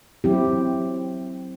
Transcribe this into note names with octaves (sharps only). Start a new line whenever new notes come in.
F#3 C4 E4 G4